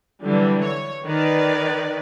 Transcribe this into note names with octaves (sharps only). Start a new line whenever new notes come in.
D3 E3 F#3 G3
C#5
D#3 B4 D5